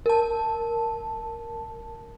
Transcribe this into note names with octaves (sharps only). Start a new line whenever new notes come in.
A#4 A5